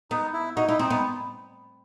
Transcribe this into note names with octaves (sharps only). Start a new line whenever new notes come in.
B3 D#4
E4
D#4 F#4
D#4 E4
C4 D#4
B3 D#4